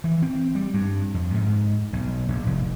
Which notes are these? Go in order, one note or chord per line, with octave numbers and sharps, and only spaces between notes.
E3
C4
G3
G2
F2
G#2
B1
A#1
F1